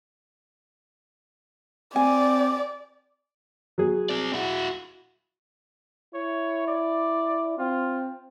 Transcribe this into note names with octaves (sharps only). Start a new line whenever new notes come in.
C4 D5 G#5
F#3 G#4
C4 D5
E4 F#4
E4 C#5
D5
C4 F4